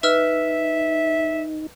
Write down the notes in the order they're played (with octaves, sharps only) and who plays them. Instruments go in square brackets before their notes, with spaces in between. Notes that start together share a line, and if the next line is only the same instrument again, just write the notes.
[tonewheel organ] D#4 [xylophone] B4 E6 F6 [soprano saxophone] E5